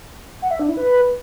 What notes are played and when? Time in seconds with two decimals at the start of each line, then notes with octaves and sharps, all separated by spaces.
0.42 F#5
0.51 E5
0.60 D4
0.68 E4
0.77 B4